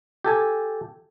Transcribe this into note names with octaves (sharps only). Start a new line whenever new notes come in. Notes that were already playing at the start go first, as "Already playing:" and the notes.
G4 A4 G#5 A5